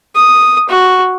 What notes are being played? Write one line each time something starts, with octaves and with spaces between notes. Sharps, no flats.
D#6
F#4